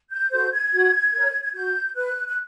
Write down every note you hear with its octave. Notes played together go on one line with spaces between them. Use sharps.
G6
F#4 A4 C5 G6
G#6
F#4
A#4 C#5
G#6
F#4 G6
B4 F#6
F#6